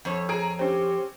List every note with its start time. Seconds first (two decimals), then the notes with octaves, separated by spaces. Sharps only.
0.05 F2 C#5
0.29 G#4 A#5 D7
0.59 C4 C#4 G4